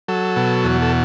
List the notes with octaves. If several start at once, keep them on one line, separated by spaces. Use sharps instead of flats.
F#3 A4
B2
E2
A4